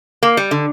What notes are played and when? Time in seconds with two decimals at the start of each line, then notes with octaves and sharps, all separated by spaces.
0.23 A#3
0.37 G3
0.51 D3